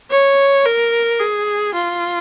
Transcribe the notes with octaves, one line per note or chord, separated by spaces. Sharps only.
C#5
A#4
G#4
F4